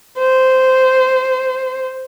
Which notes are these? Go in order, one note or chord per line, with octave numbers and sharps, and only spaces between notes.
C5